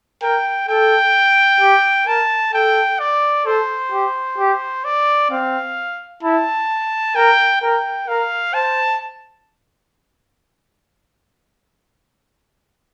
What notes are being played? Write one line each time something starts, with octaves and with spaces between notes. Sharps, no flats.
A#4 G5
A4 G5
G4
A#4 A5
A4 G5
D5
A4 C5
G4
G4
D5
C4 F5
E4 A5
A#4 G5
A#4 G5
A#4 F5
C5 A5